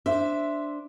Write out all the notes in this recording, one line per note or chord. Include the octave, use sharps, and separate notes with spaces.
D4 C5 E5